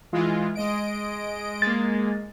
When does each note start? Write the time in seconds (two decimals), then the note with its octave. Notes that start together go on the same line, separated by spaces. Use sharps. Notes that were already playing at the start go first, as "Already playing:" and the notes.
0.13 E3 G#3 F4
0.55 G#3 D#5 D7
1.62 G#3 A#3 A6